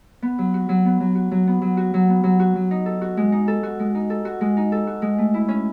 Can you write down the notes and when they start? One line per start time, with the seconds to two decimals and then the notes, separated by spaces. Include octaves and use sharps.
0.22 B3
0.38 F#3
0.54 F#4
0.69 F#3
0.85 B3
1.00 F#3
1.15 F#4
1.31 F#3
1.47 B3
1.62 F#3
1.77 F#4
1.94 F#3
2.09 B3
2.24 F#3
2.40 F#4
2.56 F#3
2.71 D#4
2.86 A4
3.01 F#4
3.17 G#3
3.32 D#4
3.48 A4
3.63 F#4
3.79 G#3
3.95 D#4
4.10 A4
4.25 F#4
4.41 G#3
4.57 D#4
4.72 A4
4.87 F#4
5.02 G#3
5.18 A3
5.34 E4
5.48 C#4